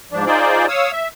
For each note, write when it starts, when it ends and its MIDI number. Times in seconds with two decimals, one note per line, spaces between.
0.12 0.25 44
0.12 0.25 53
0.12 0.25 62
0.26 0.66 63
0.26 0.66 65
0.26 0.66 68
0.26 0.66 72
0.26 0.66 74
0.68 0.91 73
0.68 0.91 77
0.68 0.91 87
0.68 0.91 88
0.92 1.08 76